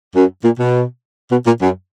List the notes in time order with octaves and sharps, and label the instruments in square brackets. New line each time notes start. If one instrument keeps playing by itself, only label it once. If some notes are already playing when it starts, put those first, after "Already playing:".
[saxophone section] F#2
A#2
B2
B2
A#2
F#2